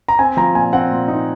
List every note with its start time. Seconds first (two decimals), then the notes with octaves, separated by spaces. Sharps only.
0.08 A#5
0.19 C4 G#5
0.37 F3 A#5
0.55 A#2 G#5
0.73 C4 F#5
0.91 A#2
1.08 D#4